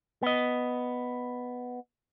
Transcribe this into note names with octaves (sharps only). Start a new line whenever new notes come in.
B3 D#5